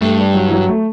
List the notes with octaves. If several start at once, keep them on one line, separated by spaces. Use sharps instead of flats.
G2 A3
G3
F#3
E3
F#3
A3